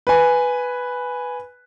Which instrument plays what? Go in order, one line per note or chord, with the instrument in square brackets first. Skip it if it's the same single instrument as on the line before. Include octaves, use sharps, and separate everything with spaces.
[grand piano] B4 G#5